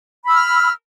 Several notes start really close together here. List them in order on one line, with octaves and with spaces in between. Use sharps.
B5 E6 F6